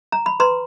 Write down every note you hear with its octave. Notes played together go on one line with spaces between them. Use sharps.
A#5
B5
B4 A#5 C6